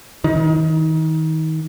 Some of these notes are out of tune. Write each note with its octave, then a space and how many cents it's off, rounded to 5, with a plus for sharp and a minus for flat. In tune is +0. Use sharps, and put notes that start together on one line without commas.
D#3 +30